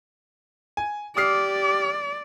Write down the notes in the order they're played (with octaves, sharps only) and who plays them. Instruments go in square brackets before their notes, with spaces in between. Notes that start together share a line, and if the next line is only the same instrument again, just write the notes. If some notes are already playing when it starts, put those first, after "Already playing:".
[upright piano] G#5
[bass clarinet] G4 [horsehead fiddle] D5 [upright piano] D#6 F6 C7